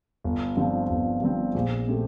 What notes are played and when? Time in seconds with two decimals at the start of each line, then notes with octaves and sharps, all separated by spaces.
0.24 G1
0.57 G2 F3 C4
0.90 G1
1.22 G2 F3 C4
1.54 A#1
1.87 A#2 A3 C4 G4